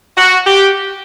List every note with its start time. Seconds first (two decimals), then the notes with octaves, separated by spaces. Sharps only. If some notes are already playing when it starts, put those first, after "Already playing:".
0.17 F#4
0.46 G4